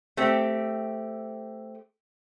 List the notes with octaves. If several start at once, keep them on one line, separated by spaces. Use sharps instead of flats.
A3 C4 G4